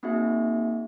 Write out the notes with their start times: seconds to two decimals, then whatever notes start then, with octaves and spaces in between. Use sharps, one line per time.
0.03 A#3 C4 D#4 F#4 G#4 E5